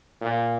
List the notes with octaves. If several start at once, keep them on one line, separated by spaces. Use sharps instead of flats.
A#2